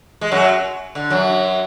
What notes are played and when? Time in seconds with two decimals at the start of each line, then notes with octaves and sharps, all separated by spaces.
0.21 G#3
0.32 F#2 F#3
0.95 D3
1.10 F#2 F#3